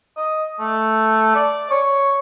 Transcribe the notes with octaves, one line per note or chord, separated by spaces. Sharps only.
D#5
A3
D5
C#5